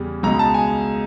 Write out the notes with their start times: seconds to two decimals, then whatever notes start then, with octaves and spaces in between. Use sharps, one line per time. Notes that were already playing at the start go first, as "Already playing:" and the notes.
Already playing: E2 C#3 G3
0.23 C#2 B2 G#3 A#5
0.39 A5
0.54 G#5